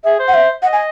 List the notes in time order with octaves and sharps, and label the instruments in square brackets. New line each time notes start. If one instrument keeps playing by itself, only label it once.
[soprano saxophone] G#4 [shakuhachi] E5
[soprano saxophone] C5
[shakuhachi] F#5
E5
[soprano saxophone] D#5 [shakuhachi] F#5
[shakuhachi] G#5